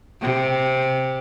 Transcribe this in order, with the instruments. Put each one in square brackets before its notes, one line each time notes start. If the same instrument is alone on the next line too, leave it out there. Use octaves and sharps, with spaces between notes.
[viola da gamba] C3